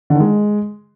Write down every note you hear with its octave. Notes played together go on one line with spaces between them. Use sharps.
D3
D#3
G#3